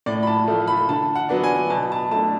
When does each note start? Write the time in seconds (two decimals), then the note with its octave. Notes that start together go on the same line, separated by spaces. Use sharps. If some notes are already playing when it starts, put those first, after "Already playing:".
0.06 A2 D5
0.23 B5
0.27 A5
0.48 F3 A3
0.68 B5
0.89 D3 A5
1.15 F#5
1.29 F#3 B3 D4
1.43 G#5
1.70 B2 A5
1.92 A5
2.11 A3 D4 A5